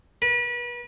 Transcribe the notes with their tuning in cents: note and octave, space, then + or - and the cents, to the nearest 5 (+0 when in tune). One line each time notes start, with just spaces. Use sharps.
B4 -35